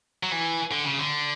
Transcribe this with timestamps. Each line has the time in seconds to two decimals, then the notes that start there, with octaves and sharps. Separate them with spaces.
0.23 F#3
0.32 E3
0.72 D3
0.85 C#3
0.98 D3